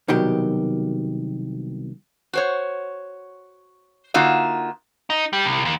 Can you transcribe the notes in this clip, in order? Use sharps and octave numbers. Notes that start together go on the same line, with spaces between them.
C2 B2 D#3 F#3 G4
F#4 C5 C#5
D3 A#3 D#4 F4 F#4 E5
D#4
G3
C2
D#2